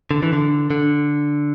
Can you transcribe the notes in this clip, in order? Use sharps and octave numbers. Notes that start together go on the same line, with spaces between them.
D3
E3
D3
D3